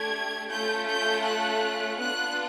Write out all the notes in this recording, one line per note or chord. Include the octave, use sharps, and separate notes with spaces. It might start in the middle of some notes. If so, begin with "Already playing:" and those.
Already playing: A3 D4 G4 G#6
A3 C#4 F4 A4 G6
G6
F#6
B3 D4 F4 F#6